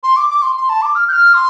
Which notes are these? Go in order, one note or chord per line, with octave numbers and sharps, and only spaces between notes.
C6
D6
D6
C6
C6
A5
D6
F6
G6
F6
C6